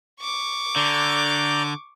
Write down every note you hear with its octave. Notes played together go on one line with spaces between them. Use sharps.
C#6 D6
D3 D5 A#5 G6